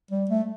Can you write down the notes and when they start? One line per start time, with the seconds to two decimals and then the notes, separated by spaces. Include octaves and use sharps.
0.11 G3
0.29 A3